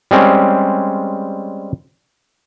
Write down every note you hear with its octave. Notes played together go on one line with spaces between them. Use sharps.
G3 G#3 C4 C#4